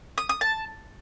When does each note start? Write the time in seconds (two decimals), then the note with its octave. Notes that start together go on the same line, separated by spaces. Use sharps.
0.18 D#6
0.29 D#6
0.41 A5